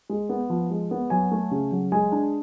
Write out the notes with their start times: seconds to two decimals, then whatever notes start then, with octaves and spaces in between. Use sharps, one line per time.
0.10 G#3
0.29 B3
0.50 F3
0.70 G#3
0.91 B3
1.10 F#3 G#5
1.32 A3
1.51 C#3
1.72 F#3
1.92 G#3 G#5
2.12 D4